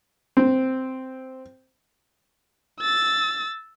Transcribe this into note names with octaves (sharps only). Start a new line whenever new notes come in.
C4
E6 A6